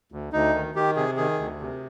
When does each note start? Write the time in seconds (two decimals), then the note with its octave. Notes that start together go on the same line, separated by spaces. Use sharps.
0.12 D2
0.33 D2 D#4
0.54 D#3
0.75 D#3 G4
0.96 C3 G#4
1.17 D#3 G#4
1.39 D2
1.61 C3